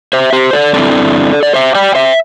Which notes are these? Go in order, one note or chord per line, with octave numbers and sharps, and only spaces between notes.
C5 E5
G4 C5
A4 D5
G2 D3 C4 E4 A4 D5
D5
C5 E5
D5 G5
C5 E5